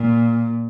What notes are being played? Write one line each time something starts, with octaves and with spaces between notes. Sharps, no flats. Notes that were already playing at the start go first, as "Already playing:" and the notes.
Already playing: A#2